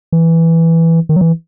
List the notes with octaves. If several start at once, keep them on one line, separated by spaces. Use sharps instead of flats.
E3
D#3
F#3
E3